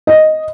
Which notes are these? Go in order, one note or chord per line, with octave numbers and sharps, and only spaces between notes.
D#5